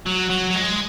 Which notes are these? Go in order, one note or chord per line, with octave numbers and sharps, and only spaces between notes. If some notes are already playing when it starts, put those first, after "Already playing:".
F#3
F#3
F#3
G#3